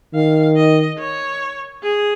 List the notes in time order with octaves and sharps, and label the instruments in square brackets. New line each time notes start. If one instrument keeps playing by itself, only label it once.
[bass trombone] D#3 [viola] F5
[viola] D#5
C#5
G#4